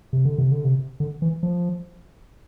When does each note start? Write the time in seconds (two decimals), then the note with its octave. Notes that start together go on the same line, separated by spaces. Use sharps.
0.13 C3
0.25 D3
0.38 C3
0.52 D3
0.65 C3
1.00 D3
1.22 E3
1.43 F3